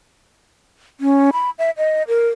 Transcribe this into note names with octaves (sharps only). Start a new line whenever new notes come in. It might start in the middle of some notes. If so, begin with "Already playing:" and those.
C#4
B5
E5
D#5
A#4